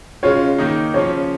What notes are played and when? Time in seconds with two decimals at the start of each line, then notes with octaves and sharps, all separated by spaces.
0.23 C#3 G#3 F4 C#5
0.58 D#3 A#3 D#4
0.94 C#3 F3 C#4 C#5